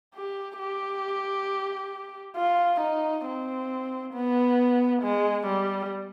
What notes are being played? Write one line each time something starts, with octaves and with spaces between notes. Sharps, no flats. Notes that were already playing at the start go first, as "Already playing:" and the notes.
G4
G4
F4
D#4
C4
B3
G#3
G3